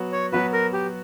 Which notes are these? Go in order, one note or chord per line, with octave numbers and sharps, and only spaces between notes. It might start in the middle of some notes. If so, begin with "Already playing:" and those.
Already playing: F#3 B3 F#4
C#5
F#3 B3 F#4 B4
A#4
G4